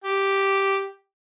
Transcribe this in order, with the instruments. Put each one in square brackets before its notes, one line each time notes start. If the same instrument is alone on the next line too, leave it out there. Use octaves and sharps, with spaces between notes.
[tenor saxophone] G4